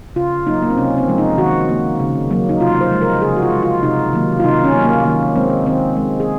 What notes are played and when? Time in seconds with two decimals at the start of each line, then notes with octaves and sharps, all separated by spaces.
0.16 C#3 F4
0.46 F#3 A#3 D#4
0.62 A#3
0.70 C4
0.77 C3 C#4
0.98 C4
1.08 F3 G#3
1.18 D#4
1.38 D#3 F#4
1.69 A#3
2.00 C#3
2.30 F#3 A#3
2.49 D#4
2.60 C3 F4
2.81 C5
2.91 F3 G#3
3.02 A#4
3.22 C#3 G#4
3.36 F#4
3.42 F4
3.52 G#3
3.63 F4
3.83 C3 D#4
4.13 D#3 F#3 A#3
4.40 F4
4.44 C3 D#4
4.64 C#4
4.75 F#3 A#3
4.85 A#3
5.05 D#3 A#3
5.36 G#3 C4
5.66 D#3 C4
5.97 G#3
6.20 G#4